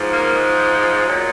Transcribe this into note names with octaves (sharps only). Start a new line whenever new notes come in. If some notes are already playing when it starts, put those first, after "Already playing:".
Already playing: G#2 F3
A#3
G#3
A#2 F#3